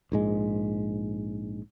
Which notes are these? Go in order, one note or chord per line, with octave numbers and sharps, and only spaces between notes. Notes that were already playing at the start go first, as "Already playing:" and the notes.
A#1 G#2 G#3